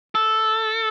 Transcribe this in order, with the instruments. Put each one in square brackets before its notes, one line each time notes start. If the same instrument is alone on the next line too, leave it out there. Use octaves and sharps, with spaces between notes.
[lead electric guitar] A4